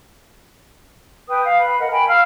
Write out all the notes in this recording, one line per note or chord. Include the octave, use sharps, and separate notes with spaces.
B4 G5 D#6
F5
B4 B5
A#4 D#5 F#5
G5 G#5 A#5 B5
F5 E6 F6